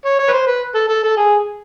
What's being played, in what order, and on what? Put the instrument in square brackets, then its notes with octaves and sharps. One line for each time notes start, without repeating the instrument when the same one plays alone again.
[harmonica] C#5
C#5
B4
C5
B4
A4
A4
A4
G#4